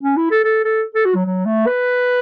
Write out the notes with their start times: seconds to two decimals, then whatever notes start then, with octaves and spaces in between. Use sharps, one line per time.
0.03 C#4
0.17 E4
0.31 A4
0.44 A4
0.64 A4
0.95 A4
1.05 F#4
1.15 F#3
1.25 F#3
1.45 A3
1.66 B4